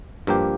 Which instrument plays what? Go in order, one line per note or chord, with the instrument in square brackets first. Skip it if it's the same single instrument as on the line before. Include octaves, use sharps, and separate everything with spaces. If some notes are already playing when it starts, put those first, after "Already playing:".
[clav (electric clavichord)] G2 F3 A#3 G4